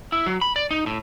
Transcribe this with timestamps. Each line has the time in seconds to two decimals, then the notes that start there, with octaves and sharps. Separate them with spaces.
0.12 E4
0.26 F#3
0.41 B5
0.56 D5
0.71 D#4
0.86 A2